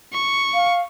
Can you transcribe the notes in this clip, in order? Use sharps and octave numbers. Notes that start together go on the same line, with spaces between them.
C#6
F5